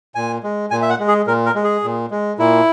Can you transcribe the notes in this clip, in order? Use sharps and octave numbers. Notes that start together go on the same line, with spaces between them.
A#2 G#5
G#3
A#2 G#5
E5
F#5
G#3
G#4
A#2 A#4
A#4
G#3
G#4
A#2
G#3
A#2 E4